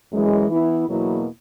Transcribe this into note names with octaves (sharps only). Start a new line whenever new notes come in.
F#2 E3 G#3
E3 B3 E4
E2 B2 F#3 A#3 E4